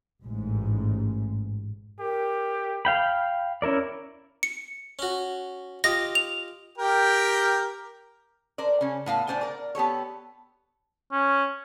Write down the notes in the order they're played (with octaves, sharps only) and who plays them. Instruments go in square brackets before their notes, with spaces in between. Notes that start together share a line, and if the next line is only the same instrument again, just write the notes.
[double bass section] A1 G#2
[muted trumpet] G4 [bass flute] A#4
[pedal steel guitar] F5 G5 B5
C#4 E4 A#4 D5
[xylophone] C#7
[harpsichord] C#4 F#4
[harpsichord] F4 G4 D#5 [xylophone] A#6
[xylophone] F7
[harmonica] G4 A#4 G5
[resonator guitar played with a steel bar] A#4 C5 D5
C#3 C#4
A2 B3 F5
A2 D4 C5 D5 G#5
A#4 D5
B3 G4 A4 C#5
[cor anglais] C#4